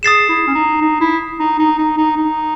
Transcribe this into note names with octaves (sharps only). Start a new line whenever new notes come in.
G#4 D#6 A6 C7 E7
E4
C#4
D#4
D#4
E4
D#4
D#4
D#4
D#4
D#4